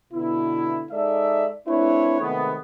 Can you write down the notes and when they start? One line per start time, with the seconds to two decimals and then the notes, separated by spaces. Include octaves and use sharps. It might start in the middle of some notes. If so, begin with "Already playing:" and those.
0.13 B2 D3 B3 E4
0.91 G#3 D#4 A4 D5 E5
1.67 A3 C4 D4 E4 B4 C#5
2.20 C3 D#3 G#3 A3 B3